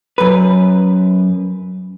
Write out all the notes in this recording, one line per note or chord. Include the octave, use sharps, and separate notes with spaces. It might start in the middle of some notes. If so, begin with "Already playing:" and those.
F#2 B4